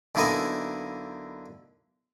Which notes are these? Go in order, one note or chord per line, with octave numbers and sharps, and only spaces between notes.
B1 D3 A#3 E4 D#5 G#5